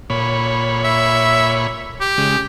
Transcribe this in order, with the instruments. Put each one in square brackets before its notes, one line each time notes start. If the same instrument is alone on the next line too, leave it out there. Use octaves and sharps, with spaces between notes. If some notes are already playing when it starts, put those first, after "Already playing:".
[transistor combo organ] A#2 C#5 B5
[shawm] E5
G4
[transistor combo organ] C#3 G#3